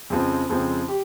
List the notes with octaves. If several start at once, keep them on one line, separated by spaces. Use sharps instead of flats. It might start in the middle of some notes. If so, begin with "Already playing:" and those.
F2 C#3 F3 G#3 C4
F2 C#3 F3 G#3 C4
G4